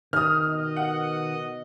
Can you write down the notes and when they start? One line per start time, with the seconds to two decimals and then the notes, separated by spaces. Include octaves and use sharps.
0.13 D#3 D#6 F6
0.48 B2 D#5
0.76 F#5